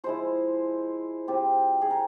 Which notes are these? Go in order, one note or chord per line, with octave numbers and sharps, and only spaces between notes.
F3 G#3 E4 C5
F3 C4 F4 G4
G#4
A#4